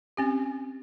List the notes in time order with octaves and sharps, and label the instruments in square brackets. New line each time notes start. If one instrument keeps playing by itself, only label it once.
[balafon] C4 C#4 G4